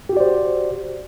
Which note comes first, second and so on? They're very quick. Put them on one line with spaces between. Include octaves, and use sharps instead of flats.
G4 F#4 D5 C5